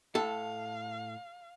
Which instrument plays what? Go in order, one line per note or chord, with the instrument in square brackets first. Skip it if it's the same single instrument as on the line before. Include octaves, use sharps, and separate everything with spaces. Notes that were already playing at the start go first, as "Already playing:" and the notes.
[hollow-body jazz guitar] A2 A4 [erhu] F5